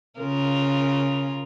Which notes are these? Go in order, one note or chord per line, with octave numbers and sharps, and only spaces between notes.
C#3 F4 A#4